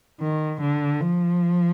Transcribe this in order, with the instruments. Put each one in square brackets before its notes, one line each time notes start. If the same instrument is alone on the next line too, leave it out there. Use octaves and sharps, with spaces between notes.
[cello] D#3
D3
F3